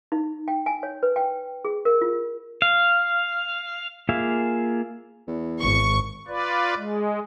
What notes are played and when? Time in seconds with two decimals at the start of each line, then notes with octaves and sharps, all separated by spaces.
0.12 D#4
0.48 G5
0.66 G#5
0.83 C#5
1.03 B4
1.16 G5
1.65 G#4
1.85 A#4
2.01 F4
2.62 F5
4.09 A#3 F4 G#4 E5 F5
5.27 E2
5.61 G#1 C#6
6.27 F4 B4 D5
6.75 G#3